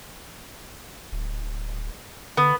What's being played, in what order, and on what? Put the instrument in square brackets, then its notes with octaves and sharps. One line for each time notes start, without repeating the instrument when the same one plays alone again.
[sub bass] D1
[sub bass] D3 [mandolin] B3